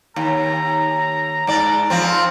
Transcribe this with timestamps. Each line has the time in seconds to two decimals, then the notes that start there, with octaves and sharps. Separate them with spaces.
0.16 D#2 A#5
1.47 G#2 D5
1.90 F2 F3 C4